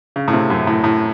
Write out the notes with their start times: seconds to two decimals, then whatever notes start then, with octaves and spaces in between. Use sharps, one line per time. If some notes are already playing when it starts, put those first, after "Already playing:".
0.16 C#3
0.28 A2
0.33 C3
0.50 F#2
0.67 A2
0.84 A2